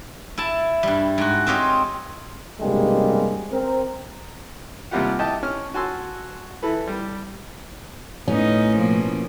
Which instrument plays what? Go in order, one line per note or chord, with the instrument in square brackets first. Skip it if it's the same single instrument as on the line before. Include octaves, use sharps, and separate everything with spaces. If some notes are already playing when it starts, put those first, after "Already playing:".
[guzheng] E4 A5
G2 G3
G#2 F#4
C4 F4 G4 C#5 D#5
[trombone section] B1 G2 C3 G3 G#3 A#3
C4 A#4
[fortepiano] D#2 C3 G3 F4 G4 F#5
E4 G4 D#5 G5 A5
C#4 F6
F#4 G#5 A5 C6 E6
E3 A4 B4
G3
[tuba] A2 [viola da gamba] B3 D#4 [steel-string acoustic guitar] C#4
[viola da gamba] B2 F3 A#3